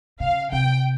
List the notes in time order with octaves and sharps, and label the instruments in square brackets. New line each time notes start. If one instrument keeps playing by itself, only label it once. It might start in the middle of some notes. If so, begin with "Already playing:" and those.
[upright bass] C#3 [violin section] F5
[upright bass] C3 [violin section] G5